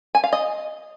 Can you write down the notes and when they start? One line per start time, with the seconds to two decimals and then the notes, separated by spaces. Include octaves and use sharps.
0.15 G#5
0.24 F5
0.33 D#5